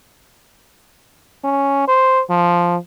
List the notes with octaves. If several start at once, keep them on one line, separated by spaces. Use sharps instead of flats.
C#4
C5
F3